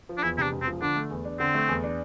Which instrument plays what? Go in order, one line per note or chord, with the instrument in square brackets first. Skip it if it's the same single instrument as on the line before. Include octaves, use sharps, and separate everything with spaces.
[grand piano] F3
[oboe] D4
[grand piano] E2 [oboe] E4
[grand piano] C3 [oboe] D4 E4
[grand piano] E1
[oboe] C4
[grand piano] F3
[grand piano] D3 [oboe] D4
[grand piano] A3
E2
D4
[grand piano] D3 [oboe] C4
[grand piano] A3
E2
D4